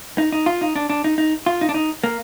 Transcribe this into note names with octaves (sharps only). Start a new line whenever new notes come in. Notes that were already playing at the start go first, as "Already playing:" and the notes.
D#4
D#4
F4
D#4
D4
D4
D#4
D#4
F4
D#4
D4
D#4
A#3